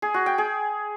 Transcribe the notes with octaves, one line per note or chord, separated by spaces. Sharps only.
G#4
F#4
G5
G#4